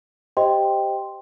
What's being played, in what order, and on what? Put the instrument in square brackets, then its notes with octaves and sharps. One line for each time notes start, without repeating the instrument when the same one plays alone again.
[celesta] G4 C5 D#5 G5 C6